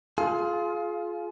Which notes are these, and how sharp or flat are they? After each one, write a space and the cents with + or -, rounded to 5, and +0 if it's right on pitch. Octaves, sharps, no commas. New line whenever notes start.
F4 +0 G#4 +30